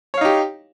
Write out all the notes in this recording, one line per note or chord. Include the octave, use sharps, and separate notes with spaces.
D#4 G4 C#5 F5